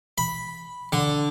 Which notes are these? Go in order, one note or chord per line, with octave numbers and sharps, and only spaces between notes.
B5
D3